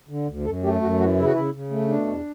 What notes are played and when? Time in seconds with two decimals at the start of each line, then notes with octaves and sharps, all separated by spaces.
0.09 D3
0.28 D2
0.45 F#2 A4
0.63 A3 G4
0.81 F#2 F#4
0.99 E3 F#4
1.17 C#3 E4
1.25 F#4
1.33 C#3 E4
1.54 C#3
1.70 A3
1.88 B2 D4
2.07 E2